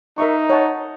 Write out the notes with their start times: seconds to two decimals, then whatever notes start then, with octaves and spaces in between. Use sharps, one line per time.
0.18 D#4 A#4 E5 C#6
0.50 C#5 F#5 A5